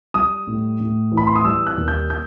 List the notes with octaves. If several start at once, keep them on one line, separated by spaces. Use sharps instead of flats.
G3 D#6
A2
A2
E3
B5
C6
D#6
G3 E6
F#6
D#2
G6
G6